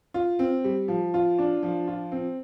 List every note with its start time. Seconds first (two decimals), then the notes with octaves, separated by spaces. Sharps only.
0.14 F4
0.39 C4
0.64 G3
0.88 F3
1.14 F4
1.38 D4
1.63 F3
1.88 F4
2.12 C4